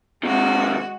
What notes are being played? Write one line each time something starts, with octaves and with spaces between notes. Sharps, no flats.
C3 D#3 G#3 F#4